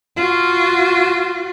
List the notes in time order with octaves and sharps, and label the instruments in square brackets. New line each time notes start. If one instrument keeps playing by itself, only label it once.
[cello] F4 F#4